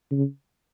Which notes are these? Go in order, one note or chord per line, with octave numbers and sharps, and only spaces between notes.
C#3